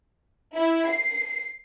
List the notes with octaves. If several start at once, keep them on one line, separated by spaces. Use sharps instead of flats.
E4
C7